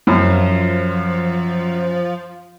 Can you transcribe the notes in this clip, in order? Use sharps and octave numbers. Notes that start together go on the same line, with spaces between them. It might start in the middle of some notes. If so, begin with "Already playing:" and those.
F#2 F3